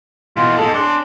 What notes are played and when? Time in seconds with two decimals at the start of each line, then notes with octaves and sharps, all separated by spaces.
0.37 B2 E3 F4
0.58 G#2 G#3 A4
0.74 C#4 D4 C6